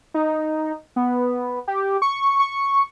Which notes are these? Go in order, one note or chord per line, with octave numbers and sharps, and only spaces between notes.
D#4
B3
G4
C#6
C#6